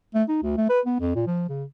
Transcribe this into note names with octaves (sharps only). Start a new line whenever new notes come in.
A3
D#4
D2
A3
B4
B3
F2
A#2
F3
C#3